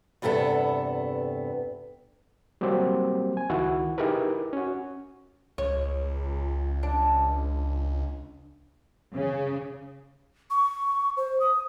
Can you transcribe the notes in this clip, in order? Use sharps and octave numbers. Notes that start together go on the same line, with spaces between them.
E2 G2 C3 B3 A4
F#3 G3 A#3 C4 G4 C5
G#5
C#2 D#3 E4 F#4
D#4 E4 G4 G#4 A#4 B4
C#4 F#4
C#2 C#5
D4
C#3
C#6
C5
D#6